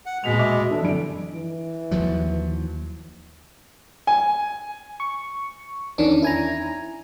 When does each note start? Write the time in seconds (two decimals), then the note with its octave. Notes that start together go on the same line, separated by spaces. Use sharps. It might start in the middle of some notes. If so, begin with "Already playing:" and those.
0.06 F#5
0.24 D#1 B2 G#3 B6 F7
0.39 D#5 E5 D6
0.70 E3 D4 A4
0.82 F#2 D3 G3 D7
1.34 E3
1.91 D#2 F3 F#3
4.07 G#5
5.00 C#6
5.98 E2 D#3 C#4 D4
6.22 E4 G#5 A#5